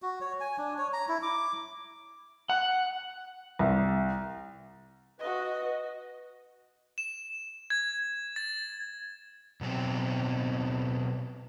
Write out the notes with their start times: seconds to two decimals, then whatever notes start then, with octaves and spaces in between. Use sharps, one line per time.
0.02 F#4
0.21 C#5
0.40 G#5
0.58 D4
0.78 C#5
0.93 A#5
1.08 E4
1.23 D6
2.49 F#5
3.59 C2
5.19 F#4 B4 D#5
6.98 E7
7.70 G#6
8.36 A6
9.61 B2 F#3 B3 C4 G4